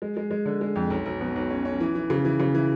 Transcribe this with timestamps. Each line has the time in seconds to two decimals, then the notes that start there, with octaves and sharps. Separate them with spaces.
0.02 G#3
0.17 G#3
0.31 G#3
0.45 D3
0.61 G#3
0.75 F2
0.90 B1
1.06 B1
1.20 B2
1.36 B1
1.50 C#4
1.65 C#4
1.80 E3
1.95 E3
2.10 C#3
2.25 E3
2.40 C#3
2.54 E3